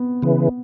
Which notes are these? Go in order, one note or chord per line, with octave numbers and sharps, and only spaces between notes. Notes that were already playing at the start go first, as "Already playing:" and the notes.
Already playing: B3 C4
C#3 E3